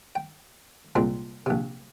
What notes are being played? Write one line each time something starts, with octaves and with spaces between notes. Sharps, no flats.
G5
C2 A#2 G#3 C4
A#1 C3